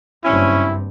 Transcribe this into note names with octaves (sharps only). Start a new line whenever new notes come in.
F#1 G2 C4 C#4 E4